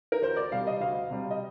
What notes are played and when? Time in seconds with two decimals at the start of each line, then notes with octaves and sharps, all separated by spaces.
0.12 A#4
0.22 D2 C5
0.36 D5
0.52 C3 G3 F5
0.67 D#5
0.80 D2 F5
1.10 C3 G3
1.30 D#5